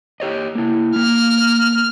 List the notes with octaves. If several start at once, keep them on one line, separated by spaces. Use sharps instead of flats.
G4 C#5 D#5
A#3 E4
A#3 F6